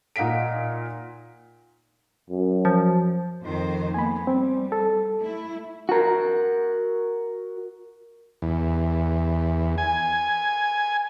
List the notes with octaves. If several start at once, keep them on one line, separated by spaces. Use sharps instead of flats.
A#2 D#4 F5 F#5 B6 D7
F#2
F3
F2 D#3 C5
A#3 B3 G#5 B5
G3 C4
A4
A3 E4
F#4 A#4
E2
G#5